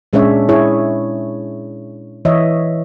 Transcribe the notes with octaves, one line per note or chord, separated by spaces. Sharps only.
A#2 G#3 C#4 D4 C#5 E5
E4 G#4 C#5
E3 C#5 D#5 E5